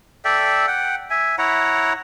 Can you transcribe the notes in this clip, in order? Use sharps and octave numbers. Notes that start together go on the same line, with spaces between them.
A4 D5 E5 G5
F#5 G5
E5 G#5
E4 C#5 F#5 A#5